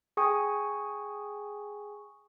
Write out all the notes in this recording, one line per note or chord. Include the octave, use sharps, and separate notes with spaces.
G#4 G5 G#5 C#6 D#6